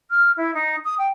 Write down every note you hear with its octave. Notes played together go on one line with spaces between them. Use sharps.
F6
E4
D#4
D#6
G5